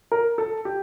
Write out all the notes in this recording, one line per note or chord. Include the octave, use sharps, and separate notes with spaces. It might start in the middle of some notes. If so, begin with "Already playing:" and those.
A#4
A4
G4